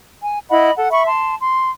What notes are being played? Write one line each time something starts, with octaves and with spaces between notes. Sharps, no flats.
G#5
E4 D#5 F#5 B5
A4 F#5
E5 B5 C#6
A5 C6
C6